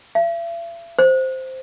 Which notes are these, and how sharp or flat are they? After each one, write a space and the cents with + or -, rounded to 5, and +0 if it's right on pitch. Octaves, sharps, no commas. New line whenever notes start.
E5 +45
C5 +0